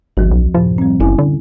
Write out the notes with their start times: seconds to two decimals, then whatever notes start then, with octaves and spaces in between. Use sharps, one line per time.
0.17 G#1 D2 F3 F#4
0.31 B1
0.54 F#2 A2 C3 F3
0.78 G3 C4
1.00 F#1 C#4 E4 G#5
1.18 D3